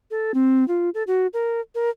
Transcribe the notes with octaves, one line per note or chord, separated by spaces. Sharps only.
A4
C4
F4
A4
F#4
A#4
A#4